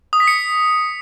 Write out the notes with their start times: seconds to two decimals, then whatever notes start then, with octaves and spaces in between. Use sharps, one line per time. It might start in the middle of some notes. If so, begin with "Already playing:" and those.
0.13 D#6
0.20 B6
0.27 C#7